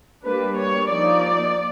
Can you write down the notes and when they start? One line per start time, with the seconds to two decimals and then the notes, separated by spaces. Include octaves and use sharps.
0.24 G3 A#3 D4 B4
0.57 C#5
0.90 F3 A#3 D#4 D5